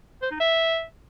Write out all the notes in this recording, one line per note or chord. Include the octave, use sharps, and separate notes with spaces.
C5
D#4
E5